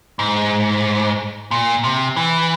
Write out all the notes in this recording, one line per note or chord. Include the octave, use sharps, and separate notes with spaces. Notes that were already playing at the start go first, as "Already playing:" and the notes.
G#2
A#2
C3
E3